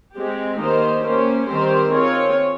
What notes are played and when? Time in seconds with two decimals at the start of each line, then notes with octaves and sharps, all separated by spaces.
0.15 G#3 C4 G4
0.59 D#3 A#3 D#4 G4 C5
1.03 A#3 C#4 G4 C5
1.48 D#3 G3 C4 G4 C5
1.91 C4 F4 G#4 C#5